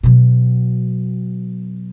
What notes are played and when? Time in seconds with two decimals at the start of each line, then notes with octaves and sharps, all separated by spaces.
0.03 B2 F#3